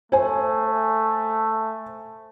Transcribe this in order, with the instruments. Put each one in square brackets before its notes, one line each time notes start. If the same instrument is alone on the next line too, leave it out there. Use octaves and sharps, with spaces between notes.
[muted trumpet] A3 [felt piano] C5 G#5